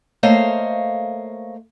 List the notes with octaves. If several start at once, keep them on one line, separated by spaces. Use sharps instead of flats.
A3 A#3 C5 C#5 D#5 F5